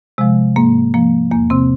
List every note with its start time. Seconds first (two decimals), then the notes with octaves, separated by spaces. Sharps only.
0.18 C3 F3 G#3
0.56 G#2 A#3
0.94 F3 A#3
1.31 E2 A#3
1.50 C3 C4